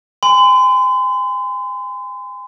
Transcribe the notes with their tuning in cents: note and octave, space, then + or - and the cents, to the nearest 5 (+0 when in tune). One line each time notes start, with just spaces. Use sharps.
G#5 -35 C6 -45